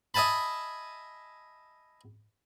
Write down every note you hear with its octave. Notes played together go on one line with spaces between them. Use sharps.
D#5 E5 G#5 A5 B5